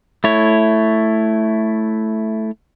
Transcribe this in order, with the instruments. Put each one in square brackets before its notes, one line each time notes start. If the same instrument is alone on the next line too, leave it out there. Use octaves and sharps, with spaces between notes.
[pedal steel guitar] A3 E4 C#5